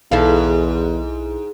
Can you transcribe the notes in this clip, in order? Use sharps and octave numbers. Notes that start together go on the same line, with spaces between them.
B1 E2 G#2 E4 A4 F5